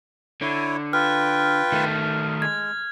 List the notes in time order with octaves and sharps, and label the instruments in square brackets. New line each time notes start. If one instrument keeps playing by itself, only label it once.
[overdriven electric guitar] D3 [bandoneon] E4 C#5
[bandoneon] F4 B4 G5 [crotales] F6
[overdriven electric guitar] D#3 A3
[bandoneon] G#3 [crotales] G#6